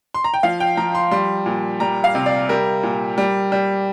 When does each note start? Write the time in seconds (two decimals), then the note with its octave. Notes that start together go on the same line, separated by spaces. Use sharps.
0.14 C6
0.24 A#5
0.34 G5
0.43 F3 F5
0.60 G5
0.77 F3 A#5
0.95 C6
1.11 G3 C6
1.46 A#2
1.80 G3 A#5
2.04 F5
2.15 C3
2.26 D5
2.49 G3 A#4
2.83 A#2
3.18 G3
3.52 G3